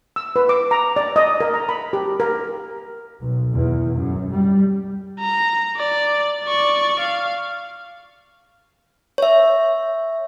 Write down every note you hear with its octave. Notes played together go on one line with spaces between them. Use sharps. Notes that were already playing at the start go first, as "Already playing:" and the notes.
E6
B4
D6
A#5
D5
D#5
A#4
A#5
B5
G4
A#4
B1
E2
F#2
G3
A#5
D5
D5 C#6
F5
C#5 E5